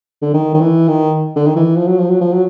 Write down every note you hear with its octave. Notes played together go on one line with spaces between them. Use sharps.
D3
D#3
D#3
E3
D#3
D3
D#3
E3
F3
F#3
F3
F#3
F3
F#3